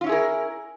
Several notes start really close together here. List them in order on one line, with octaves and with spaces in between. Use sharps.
F4 C#4 E4 G#4 A#4